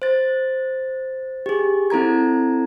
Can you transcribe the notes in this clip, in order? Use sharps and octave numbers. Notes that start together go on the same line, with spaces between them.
C5 A6
G4 G#4
C4 E4 A4 A#5 G#6